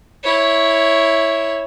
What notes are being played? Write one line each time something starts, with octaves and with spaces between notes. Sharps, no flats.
E4 C#5